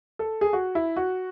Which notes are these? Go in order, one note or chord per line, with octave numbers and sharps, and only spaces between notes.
A4
G#4
F#4
E4
F#4